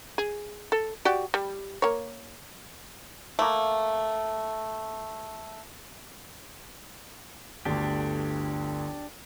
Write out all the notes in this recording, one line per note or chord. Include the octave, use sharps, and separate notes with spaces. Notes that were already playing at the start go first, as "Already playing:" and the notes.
G#4
A4
F#4 G4 D5
G3
A#3 C#5
A3 A#3
G1 D2 D4 G4